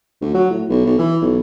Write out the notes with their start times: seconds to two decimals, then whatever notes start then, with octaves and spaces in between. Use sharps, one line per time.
0.21 D2
0.34 F#3
0.50 A2
0.69 B1
0.86 B1
0.98 E3
1.21 B1